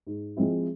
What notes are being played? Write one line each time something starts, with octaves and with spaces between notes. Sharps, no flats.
G#2
F3 G#3 C4 E4